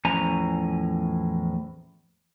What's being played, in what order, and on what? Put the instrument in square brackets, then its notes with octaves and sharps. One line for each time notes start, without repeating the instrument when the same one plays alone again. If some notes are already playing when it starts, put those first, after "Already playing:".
[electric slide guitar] E2 A2 F3 C#4 G#5 A#5